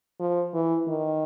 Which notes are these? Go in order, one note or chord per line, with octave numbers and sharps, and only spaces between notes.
F3
E3
D#3